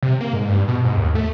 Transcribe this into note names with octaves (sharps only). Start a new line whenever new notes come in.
C3
A#3
G#2
G2
B2
G#2
D#2
A3